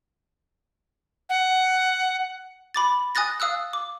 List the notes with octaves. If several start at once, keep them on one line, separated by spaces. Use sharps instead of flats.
F#5
B5 D6 A6
G#5 D#6 F#6 A6 A#6
F5 D#6 E6 F#6
D6